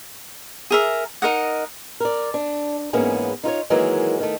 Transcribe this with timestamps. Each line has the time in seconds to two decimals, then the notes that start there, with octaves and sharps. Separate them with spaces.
0.70 G#4 A#4 E5
1.22 D#4 A#4 D#5 F#5
2.00 A#4 D5
2.34 D4
2.93 G#2 E3 A#3 B3 C#4 G#4
3.44 D#4 F4 A4 C#5
3.70 D#3 E3 F#3 G#3 A#3
4.20 D#3 A3